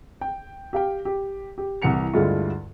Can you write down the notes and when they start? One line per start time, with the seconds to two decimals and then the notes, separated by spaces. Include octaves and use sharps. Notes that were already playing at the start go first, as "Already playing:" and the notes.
0.21 G5
0.73 G4 F5 G5
1.05 G4
1.58 G4
1.82 C2 E3 F#5 C#7 F7
2.14 D2 G2 D3 G#3 E4 F4